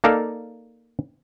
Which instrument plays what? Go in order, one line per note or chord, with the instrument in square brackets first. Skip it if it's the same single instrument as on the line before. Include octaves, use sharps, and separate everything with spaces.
[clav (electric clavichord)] A#3 D#4 A4 D5 F5